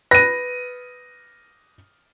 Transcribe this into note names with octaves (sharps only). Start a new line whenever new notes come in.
B4 A#6 D#7